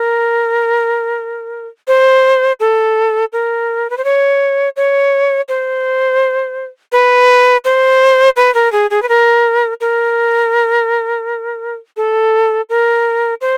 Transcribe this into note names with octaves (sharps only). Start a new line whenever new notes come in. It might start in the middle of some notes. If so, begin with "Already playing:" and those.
Already playing: A#4
C5
A4
A#4
B4
C5
C#5
C#5
C5
B4
C5
B4
A#4
G#4
G#4
B4
A#4
A#4
A4
A#4
C5